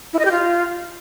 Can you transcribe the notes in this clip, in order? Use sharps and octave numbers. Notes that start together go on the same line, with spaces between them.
E4
D#5
G4
F4